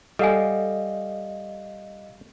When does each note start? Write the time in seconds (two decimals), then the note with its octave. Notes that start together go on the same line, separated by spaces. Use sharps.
0.19 G3 A4 D#5 F5 F#5 G#5